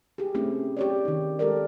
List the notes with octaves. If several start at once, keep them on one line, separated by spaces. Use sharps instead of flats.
G4 G#4
A3 C4 C#4 E4
G4 C#5 D5
D#3 D#4
G#3 G4 A4 A#4 D5